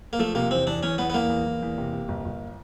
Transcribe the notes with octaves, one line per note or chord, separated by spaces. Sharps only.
A#3
F3 A3
C3 A#3
E2 C4
E2 D4
E2 C#4
E2 B3
B3
E2 A#3
E2
E2
E2
C3
C3
G1
G1